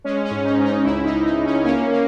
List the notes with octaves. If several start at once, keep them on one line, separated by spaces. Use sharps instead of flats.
G#3 C#4
C#4
G#2
D#4
G#2
D#4
C#2 E4
D#4
C#2
D#4
C#2
C#4
A#3 C#4
A#3